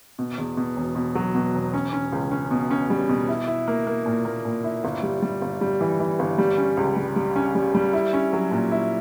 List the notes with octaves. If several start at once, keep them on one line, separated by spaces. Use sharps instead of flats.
B2
E2
B2
E1
B2
F#3
B2
E1
C#4
C#4
C#2
C#4
B2
C#4
G3
B2
E4
E4
A#3
A#3
A#2
A#3
A#2
E4
G1
G3
G3
G1
G3
E3
E3
G1
G3
C#4
C#2
G3
G3
C#4
G3
G3
E4
C#4
F#3
A#2
E4